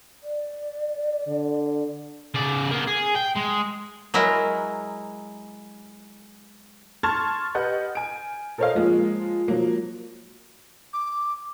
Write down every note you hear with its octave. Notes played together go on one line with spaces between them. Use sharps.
D5
D3
C#3 D5
A#3 B3
G#4
G5
G#3
F#3 G#3 E4 A#4
A5 C6 C#6 F6 G#6 A6
G4 B4 D#5 F#5 G6
G#5 D7
A4 A#4 C5 C#5 D#5 F5
F3 G#3 A#3 F4
F3 F#3 A#3
D6